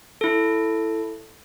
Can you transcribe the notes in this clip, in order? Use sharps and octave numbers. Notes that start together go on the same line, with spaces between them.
E4 A4